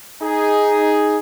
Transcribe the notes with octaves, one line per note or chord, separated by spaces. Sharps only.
D#4 G#4